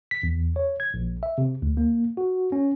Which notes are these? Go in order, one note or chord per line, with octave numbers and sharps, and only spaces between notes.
B6
E2
C#5
G#6
A#1
E5
C3
D2
A#3
F#4
C#4